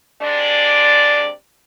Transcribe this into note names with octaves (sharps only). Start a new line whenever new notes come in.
C3 G#3 D4 D5